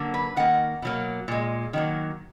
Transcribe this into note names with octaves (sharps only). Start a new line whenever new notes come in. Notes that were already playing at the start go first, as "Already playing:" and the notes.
Already playing: D3 F#3 A#3
B4
D#3 A#3 F#5
B2 F#3 A#3
A#2 G#3
D#3 F#3 A#3